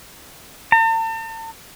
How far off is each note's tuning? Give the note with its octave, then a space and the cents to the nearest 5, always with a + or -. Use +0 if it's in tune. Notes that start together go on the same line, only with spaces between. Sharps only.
A5 +45